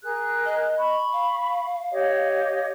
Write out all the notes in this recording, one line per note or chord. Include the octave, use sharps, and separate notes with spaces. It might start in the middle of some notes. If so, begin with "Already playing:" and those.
G#4 A#4 F#6
D#5
B5 C#6
F5
G4 C#5 D#5